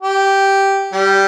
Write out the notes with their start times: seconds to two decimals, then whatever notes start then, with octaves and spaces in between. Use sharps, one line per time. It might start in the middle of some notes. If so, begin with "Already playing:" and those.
0.02 G4
0.93 G3